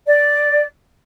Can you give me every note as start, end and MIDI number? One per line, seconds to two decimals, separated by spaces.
0.06 0.65 74